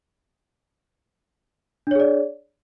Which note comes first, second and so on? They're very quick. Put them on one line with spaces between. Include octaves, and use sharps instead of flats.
D4 C#5 G#4 D5